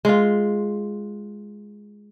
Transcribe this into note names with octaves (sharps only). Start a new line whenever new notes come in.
G#3 F4